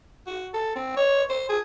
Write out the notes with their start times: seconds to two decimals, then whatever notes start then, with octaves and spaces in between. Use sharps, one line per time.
0.27 F#4
0.54 A4
0.76 C4
0.97 C#5
1.30 C5
1.49 G#4